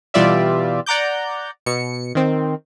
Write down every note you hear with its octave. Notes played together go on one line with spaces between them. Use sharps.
B2 E3 G3 F4 D5 E5
D5 F#5 A#5 D6 G6
B2 C#7
D#3 C4